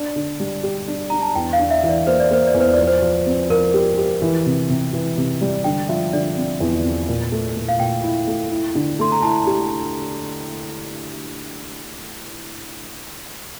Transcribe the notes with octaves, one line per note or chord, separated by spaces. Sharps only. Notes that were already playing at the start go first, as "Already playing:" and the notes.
Already playing: D4
D3
G3
G4
D4
D4 A#5
A5
E2 G5
F5
D4
E5
E3
D5
A#3 C5
D5
A#3 C5
D5
E2
C5
D5
F3
C5
F3
C4
F3 A#4
G4
G4
E3
C3
C3
E3
C3
G3
D3 G5
F3 E5
D3 D5
C4
E2
C4
A#2
A3
A#2
F5
A#2 G5
E4
A3
E4
D3
A3 C6
A#5
E4 A5
G4